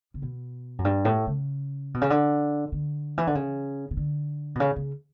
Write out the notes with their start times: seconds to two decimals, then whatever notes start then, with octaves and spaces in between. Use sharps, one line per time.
0.14 C#3
0.22 B2
0.79 F#2
0.85 G2
1.05 A2
1.27 C#3
1.94 B2
2.01 C#3
2.10 D3
2.72 D3
3.18 E3
3.27 D3
3.35 C#3
3.91 C#3
3.97 D3
4.55 B2
4.60 C#3
4.76 C#3